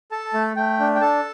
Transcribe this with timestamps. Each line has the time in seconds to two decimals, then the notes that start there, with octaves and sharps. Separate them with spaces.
0.11 A4 A5
0.34 A3
0.56 A3 G5
0.80 D4
0.95 G5
1.01 A4 A5